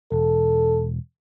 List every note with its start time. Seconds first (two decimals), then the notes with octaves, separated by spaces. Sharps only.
0.12 E1 A4